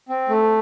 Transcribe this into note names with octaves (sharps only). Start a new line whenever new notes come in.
C4
A3